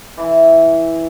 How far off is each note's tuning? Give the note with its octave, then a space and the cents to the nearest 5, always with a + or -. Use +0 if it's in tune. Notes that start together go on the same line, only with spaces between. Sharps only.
E3 -5